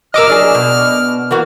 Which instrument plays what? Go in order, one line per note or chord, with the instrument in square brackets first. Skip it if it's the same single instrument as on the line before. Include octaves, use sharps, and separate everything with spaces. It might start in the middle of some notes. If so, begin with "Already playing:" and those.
[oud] G2 A#4 [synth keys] D#5 D6 E6 [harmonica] F6
[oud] F#3 D4 G#4
B2
E3 A#3 F#4